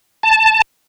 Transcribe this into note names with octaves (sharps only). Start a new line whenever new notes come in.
A5